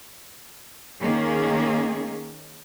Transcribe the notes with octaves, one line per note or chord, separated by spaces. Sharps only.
D#3 A#3 C#4 G#4